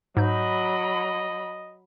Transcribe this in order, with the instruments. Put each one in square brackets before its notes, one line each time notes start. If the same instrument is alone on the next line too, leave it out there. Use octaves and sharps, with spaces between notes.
[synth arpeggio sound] G#2 G6 [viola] F#3 B5 [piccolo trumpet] D#5